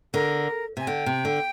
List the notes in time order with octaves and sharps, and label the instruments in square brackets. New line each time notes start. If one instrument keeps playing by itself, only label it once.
[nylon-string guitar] D3 [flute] A#4
[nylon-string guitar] C3 [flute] G#5
[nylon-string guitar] D3 [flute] G5
[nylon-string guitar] C3
D3